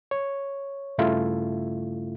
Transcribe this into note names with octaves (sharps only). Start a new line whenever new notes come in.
C#5
G2 C#3 A3 E4 F4